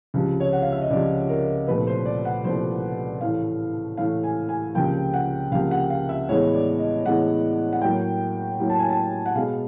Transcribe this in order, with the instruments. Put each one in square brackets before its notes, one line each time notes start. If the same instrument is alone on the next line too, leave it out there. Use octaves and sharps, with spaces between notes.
[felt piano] C#2 C3 F3
C#5
F#5
F5
E5
D#5
C#2 C3 F3 D5
A#4
C2 A#2 F3 A3 B4
C5
D5
F#5
C2 A#2 F3 A3 C5
A2 E3 A3 F5
A2 E3 A3 F5
G#5
G#5
C#2 C3 F3 A#3 G5
F#5
C#2 C3 F3 A#3 F5
F#5
F5
E5
A2 E3 G#3 B3 C#5
D5
D#5
A2 E3 G#3 B3 F#5
F#5
A2 F#3 A#3 G5
A2 F#3 A#3
A5
G#5
A5
F#5
B2 G#3 B3 F5